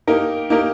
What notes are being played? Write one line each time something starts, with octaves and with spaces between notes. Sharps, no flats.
A#3 D#4 G4 A#4
A#3 D#4 G4 A#4